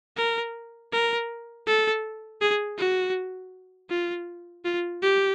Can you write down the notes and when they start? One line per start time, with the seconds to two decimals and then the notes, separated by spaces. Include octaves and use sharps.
0.17 A#4
0.92 A#4
1.67 A4
2.41 G#4
2.78 F#4
3.90 F4
4.65 F4
5.02 G4